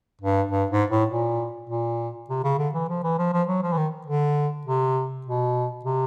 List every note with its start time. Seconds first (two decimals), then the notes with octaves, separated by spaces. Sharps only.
0.21 G2
0.51 G2
0.71 G#2
0.90 A2
1.10 A#2
1.69 A#2
2.30 C3
2.44 C#3
2.59 D3
2.74 E3
2.89 F3
3.04 E3
3.18 F3
3.33 F3
3.48 F#3
3.63 F3
3.72 E3
3.77 D#3
4.07 D3
4.66 C3
5.26 B2
5.84 C3